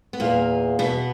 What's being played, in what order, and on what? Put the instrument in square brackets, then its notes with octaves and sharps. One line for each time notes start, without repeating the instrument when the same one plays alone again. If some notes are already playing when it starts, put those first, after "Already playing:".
[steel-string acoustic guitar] B3
[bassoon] E2 [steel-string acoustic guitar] A#2 A#3
[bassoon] E2 [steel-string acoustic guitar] B2 B3